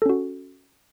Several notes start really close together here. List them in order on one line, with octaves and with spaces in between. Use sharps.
A4 C#4 F#4